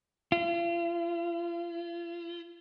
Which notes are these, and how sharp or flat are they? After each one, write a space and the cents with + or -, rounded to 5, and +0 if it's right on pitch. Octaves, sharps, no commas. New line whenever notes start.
F4 -40